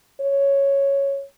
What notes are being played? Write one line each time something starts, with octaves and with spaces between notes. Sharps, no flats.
C#5